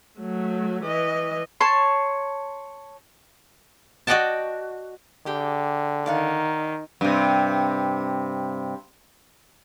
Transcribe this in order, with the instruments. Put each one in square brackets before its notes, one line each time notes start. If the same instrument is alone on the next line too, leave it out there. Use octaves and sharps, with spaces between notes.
[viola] F#3 A3
E3 D#5
[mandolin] C#5 A5 C6
[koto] F#4 D5 D#5 F#5 G5 A5
[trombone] D3 [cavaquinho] G4 G#4 G5
[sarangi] D#3 [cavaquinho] D5 F5 F#5
[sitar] G2 C3